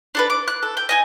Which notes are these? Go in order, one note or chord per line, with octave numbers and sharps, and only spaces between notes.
D4 A4 B4
D6
F#6
A4
G5
D#5 G5 G#5